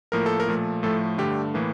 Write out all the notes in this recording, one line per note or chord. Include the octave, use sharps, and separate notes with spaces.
A2 F3 A#3 A#4
A4
A#4
A#2 F3 A3
A2 F3 A3 A4
G2 D3 A3 G4
A2 E3 A#3